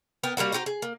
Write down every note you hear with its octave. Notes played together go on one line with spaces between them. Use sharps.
B3 A#4 G5
G3 G#3 A#3 F#4
F#4 G4 C5 A#5
G#4
A#3